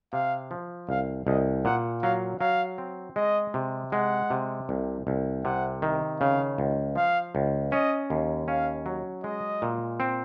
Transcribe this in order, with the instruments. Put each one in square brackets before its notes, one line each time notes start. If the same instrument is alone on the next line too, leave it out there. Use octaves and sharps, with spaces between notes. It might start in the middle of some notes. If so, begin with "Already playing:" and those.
[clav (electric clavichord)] C3 [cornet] F5
[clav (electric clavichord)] F3
[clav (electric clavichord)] C2 [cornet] F5
[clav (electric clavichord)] C2 [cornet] D#5
[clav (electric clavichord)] A#2 [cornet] F#5
[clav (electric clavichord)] F#3 [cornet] F5
[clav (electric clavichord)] F#3 [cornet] F5
[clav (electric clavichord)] C4
[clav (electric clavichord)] G#3 [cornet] D#5
[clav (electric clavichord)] C3
[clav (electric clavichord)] G#3 [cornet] F#5
[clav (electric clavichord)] C3
C2
C2
[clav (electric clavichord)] C3 [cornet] F#5
[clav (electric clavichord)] D#3
[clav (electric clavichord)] C#3 [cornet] F5
[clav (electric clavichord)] C#2
[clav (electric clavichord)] F3 [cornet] F5
[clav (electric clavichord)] C#2
[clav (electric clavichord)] C#4 [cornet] D#5
[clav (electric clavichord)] D#2
[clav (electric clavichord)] C#4 [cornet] F5
[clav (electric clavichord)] F#3
[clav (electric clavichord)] G#3 [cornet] D#5
[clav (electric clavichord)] A#2
C4